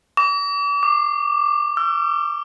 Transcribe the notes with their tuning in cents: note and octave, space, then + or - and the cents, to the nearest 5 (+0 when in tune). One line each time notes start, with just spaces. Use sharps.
D6 -40
D6 +20
E6 +45